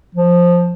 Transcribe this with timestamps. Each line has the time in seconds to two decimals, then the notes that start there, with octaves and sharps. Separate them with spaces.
0.15 F3